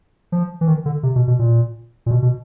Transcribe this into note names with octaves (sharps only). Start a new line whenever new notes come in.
F3
E3
D#3
D3
C3
B2
B2
A#2
A#2
B2
B2